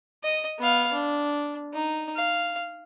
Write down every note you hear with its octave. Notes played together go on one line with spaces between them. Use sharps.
D#5
B3 F5
D4
D#4
F5